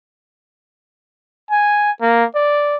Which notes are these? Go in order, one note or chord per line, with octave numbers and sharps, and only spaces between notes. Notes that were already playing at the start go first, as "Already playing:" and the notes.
G#5
A#3
D5